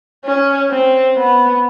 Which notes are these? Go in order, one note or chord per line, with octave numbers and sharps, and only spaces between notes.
C#4
C4
B3